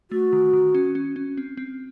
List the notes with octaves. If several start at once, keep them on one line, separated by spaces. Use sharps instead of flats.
A3 F#4
D#3
D#3
C#4
C#4
C#4
C4
C4